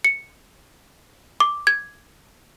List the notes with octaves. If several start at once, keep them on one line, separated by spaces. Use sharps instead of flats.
C#7
D6
G#6